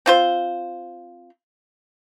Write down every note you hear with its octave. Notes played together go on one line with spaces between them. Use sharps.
C4 F4 C5